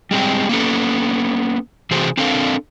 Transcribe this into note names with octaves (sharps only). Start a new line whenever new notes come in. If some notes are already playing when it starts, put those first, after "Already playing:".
G3 G#3 C4 G5
A#3 B3 C#4 A4
C3 E3 A3 F#4 G#4 C5
C4 D4 A4 A#4 F5